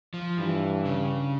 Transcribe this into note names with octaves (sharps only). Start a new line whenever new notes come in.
F3
G2 E3
C#3